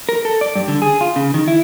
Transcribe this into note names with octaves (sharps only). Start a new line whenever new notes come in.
A#4
A4
D5
G2
D3
G#4
F4
C#3
D#3
E4